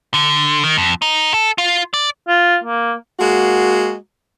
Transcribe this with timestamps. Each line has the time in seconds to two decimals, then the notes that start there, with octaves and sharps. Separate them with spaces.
0.14 D3
0.64 D#3
0.78 F2
1.02 D#4
1.34 A4
1.58 F4
1.94 D5
2.28 F4
2.64 A#3
3.19 G#3 A#3 F#4